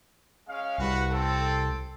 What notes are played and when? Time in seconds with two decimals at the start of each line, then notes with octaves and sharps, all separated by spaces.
0.48 G#3 C#4 F5
0.78 C2 F#4 B4
1.10 C4 A4